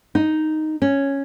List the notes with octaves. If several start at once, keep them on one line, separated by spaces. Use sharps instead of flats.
D#4
C#4